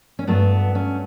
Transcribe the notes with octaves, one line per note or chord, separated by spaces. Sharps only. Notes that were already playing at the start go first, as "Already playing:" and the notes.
C#4
G2 F#3 A3 B3
C#4